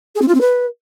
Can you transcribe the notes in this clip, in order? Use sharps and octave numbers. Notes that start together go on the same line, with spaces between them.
G#4
C4
F4
C4
B4